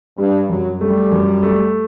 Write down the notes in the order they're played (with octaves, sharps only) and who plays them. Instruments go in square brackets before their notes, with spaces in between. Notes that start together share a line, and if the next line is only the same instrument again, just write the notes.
[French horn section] G2 [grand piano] G3
[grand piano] F#2 [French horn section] F#3
[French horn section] G3 [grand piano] A3
[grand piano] F#2
A3